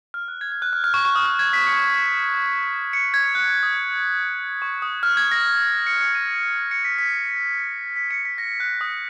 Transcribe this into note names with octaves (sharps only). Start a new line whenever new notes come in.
F6
F#6
G#6
G#6
F#6
F6
F6
C#6
C#6
D#6
F6
G#6
B6
C#7
C#7
G#6
F#6
D#6
C#6
D#6
F6
G#6
A#6
C#7
C#7
D#7
C#7
B6
B6
B6
C#7
B6
A#6
F#6
D#6